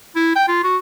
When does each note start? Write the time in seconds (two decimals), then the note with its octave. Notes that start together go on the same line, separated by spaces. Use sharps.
0.16 E4
0.36 G5
0.48 F4
0.64 F#4